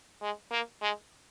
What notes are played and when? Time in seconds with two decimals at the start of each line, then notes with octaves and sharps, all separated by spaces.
0.22 G#3
0.51 A#3
0.82 G#3